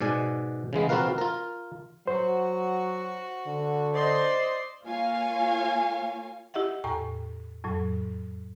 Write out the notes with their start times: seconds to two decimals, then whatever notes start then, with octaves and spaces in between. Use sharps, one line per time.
0.01 G#2 B2 D5 G#5
0.73 C#3 E3 G#3 B3
0.89 C4 F4 F#4 A#4 B4 F5
1.18 F4 A#4
2.07 F#3 F#4 C5
3.47 D3
3.94 C5 D5 D#5 C6
4.84 A#3 F4 C#5 F5 G#5
6.54 E4 G4 D#5 E5 F#5
6.84 E2 A2 G5 A#5 C#6
7.64 F2 A2 F#3